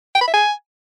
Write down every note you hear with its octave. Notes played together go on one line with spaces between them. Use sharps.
G5
B5
E5
G#5